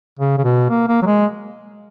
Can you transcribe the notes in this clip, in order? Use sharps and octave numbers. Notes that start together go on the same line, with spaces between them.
C#3
C#3
B2
A#3
A#3
F#3
G#3